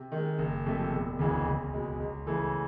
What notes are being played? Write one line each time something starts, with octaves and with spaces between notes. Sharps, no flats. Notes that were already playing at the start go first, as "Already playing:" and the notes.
Already playing: C3
D#3 G#3
F#1
F2 C3 F3 A3
E1
D2 C#3 E3 G#3
C#2
B2 G#3
C#2
C#3 E3 A3